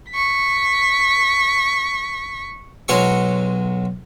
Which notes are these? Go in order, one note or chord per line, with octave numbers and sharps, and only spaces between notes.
C#6 B6
B1 F#3 G#3 C#5 C6 C#6